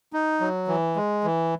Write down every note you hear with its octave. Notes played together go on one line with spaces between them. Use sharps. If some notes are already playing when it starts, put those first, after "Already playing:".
D#4
F#3
E3
G#3
E3